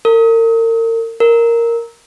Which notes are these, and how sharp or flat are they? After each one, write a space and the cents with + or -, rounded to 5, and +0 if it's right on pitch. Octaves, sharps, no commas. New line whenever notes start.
A#4 -40
A#4 -5